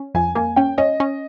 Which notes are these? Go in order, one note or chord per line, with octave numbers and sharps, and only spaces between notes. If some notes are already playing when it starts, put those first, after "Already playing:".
Already playing: C#4
F2 G#5
A#3 G#5
C#4 G5
C#4 D#5
C#4